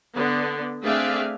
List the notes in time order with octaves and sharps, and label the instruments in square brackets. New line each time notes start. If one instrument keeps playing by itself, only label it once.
[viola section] D3 B3
A3 C4 D4 G#4 E5 F5